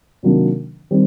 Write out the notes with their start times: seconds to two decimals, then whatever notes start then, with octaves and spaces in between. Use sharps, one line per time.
0.23 C3 D#3 F#3 A#3 D4
0.91 D#3 G3 C4